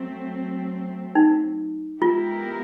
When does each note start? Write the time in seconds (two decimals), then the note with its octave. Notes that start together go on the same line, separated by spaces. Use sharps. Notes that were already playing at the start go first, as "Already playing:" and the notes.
Already playing: F#3 A3 C4
1.15 D#4
2.01 G#3 B3 E4 F4 G4 A#4